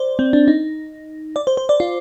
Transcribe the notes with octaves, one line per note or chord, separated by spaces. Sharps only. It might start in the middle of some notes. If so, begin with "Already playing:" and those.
Already playing: C5 D5
C4
D4
D#4
D5
C5
C5
D5
F4